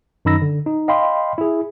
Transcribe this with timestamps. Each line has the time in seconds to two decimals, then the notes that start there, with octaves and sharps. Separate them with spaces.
0.25 F#2 D#3 D#4 B5 E6 A#6
0.42 D3
0.66 D#4
0.88 D#5 F5 G5 B5 C6
1.38 E4 G#4